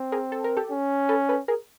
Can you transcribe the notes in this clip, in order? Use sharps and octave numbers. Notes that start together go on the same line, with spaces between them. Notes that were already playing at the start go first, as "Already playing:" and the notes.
Already playing: C4
G#4 A#4
A4
A#4
G4 A4
C#4
A4 B4
A4 B4
G#4 A#4